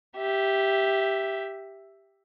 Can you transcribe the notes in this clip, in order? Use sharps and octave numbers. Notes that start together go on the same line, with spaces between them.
G4 E5